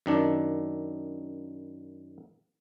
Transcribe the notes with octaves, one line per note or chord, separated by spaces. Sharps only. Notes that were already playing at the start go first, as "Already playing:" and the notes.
F#2 D#3 D4